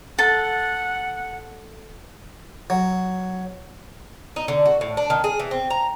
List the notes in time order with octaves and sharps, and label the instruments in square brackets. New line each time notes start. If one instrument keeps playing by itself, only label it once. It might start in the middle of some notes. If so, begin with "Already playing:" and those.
[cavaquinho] A4 A5 [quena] F#5
[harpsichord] F#3
[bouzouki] D#4
D3
F#4
A2
D4
D#3
G#4
E3
C4
A#5